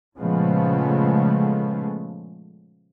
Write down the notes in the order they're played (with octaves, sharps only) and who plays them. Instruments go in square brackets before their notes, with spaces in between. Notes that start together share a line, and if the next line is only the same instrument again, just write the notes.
[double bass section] A#2 C#3 F3 G#3 A3 B3